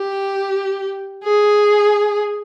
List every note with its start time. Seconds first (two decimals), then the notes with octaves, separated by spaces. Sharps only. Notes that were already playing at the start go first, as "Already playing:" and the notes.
Already playing: G4
1.24 G#4